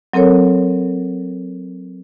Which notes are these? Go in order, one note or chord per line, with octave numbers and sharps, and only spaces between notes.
F#3 C4 A4 A#4 C#5